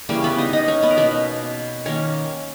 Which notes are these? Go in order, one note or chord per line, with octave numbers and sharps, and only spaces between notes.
C#3 E3 G3 A#3 C#4
B3 B4
D#4 D#5
D#4 D#5
C#4 C#5
B3 B4
A#4
B2 A#3 B3 B4
D#3 A#3 C#4 C#5